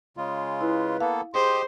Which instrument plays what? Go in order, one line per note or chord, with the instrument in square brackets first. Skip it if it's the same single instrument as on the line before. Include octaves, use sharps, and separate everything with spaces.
[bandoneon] C#3 G#3 F4
[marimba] E4 [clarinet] B4
[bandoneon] A#3 B3 A4 [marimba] F5
[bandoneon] G4 D#5 [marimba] G#4 [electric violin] C5 [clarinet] C6